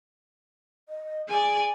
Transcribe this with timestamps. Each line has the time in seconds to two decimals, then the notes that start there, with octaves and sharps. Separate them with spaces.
0.89 D#5
1.29 G#4 D5 G#5